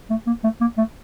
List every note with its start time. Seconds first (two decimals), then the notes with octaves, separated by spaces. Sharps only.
0.10 A3
0.27 A#3
0.44 A3
0.61 A#3
0.78 A3